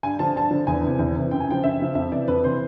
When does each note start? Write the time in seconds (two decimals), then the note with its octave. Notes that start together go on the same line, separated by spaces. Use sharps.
0.03 G2 G#5
0.19 D3 F3 A5
0.36 G2 A5
0.51 D3 F3
0.67 E2 G#5
0.83 C3 E3
0.99 E2
1.15 C3 E3
1.31 F#2 G5
1.40 G#5
1.48 C#3 F3 G5
1.64 F#2 E5
1.80 C#3 F3
1.95 F2 E5
2.12 C3 E3 D5
2.28 F2 B4
2.44 C3 E3 C5